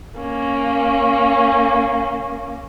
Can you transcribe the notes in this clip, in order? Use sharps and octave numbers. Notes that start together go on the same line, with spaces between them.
A#3 C#4